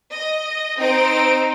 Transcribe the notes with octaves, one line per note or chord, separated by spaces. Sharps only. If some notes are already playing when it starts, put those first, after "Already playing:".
D#5
C4 D#4 C5 D7